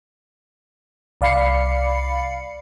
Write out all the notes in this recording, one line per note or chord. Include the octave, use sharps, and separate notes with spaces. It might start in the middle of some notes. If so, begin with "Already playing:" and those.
C2 D5 F5 B5 C7 C#7